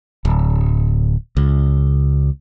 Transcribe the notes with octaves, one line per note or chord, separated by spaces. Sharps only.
D1
C#2